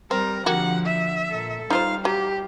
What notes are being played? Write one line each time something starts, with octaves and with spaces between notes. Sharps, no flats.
G3 C4 A#4
D3 F3 A#3 F#4 G4 F#5
E5
A#2 A4
G3 D#4 F4 C5 F5
F#3 G4